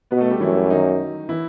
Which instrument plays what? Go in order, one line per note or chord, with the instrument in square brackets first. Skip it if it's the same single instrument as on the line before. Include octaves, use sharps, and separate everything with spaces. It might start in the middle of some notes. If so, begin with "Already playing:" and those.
[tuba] B2 [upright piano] B3 B4
[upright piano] A3 A4
G3 G4
[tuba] F#2 [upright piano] E3 E4
[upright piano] D#3 D#4
E3 E4